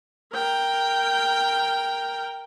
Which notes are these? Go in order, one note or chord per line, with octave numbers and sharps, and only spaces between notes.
A#4 G5